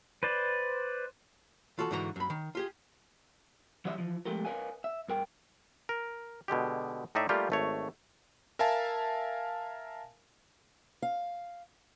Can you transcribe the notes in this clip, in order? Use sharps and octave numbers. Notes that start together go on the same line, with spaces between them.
B4 C5 D5
E3 F4 F#4 A4
G#2 D3 E3 F#4 A#5
F#2 B5
D#3
F4 G4 G#4
E3 F#3 G3 C#5 D#5 E5
E3 F3
F3 G#3 A3 G4 A4 A#4
A#4 B4 C#5 D#5 F5 G#5
E5
G2 A#4 G5
A#4
B2 D3 G#3 G4
A2 D#4 D5 E5
G3 A3 A#3 F4 G4
G#1 A3 C#5
A#4 E5 F5 G#5 A5
F5